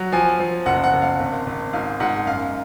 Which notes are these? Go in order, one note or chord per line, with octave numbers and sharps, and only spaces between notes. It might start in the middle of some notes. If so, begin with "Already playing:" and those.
Already playing: F#3
F3 G#5
F3
F#1 F#5
F#5
F#1
F5
G#1
G#1
G#2 F5
G#2 F#5
F#2 F5